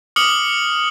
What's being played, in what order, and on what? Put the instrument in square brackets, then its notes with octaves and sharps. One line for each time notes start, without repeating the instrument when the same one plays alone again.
[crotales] D6 D#6 F6 C#7 F#7